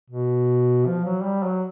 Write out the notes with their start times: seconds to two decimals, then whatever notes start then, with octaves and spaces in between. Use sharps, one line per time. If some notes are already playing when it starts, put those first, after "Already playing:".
0.10 B2
0.86 F3
1.05 F#3
1.23 G3
1.43 F#3